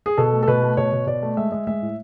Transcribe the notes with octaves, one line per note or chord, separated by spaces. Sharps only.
G#4
B2 A4
A3
A4
B2 B4
A3
B2 C#5
B2
B2 D5
A3
G#3 E5
G#3
G#3 E5
A2